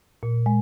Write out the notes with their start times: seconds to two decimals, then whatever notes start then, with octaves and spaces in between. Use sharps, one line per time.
0.23 A#2
0.46 G#3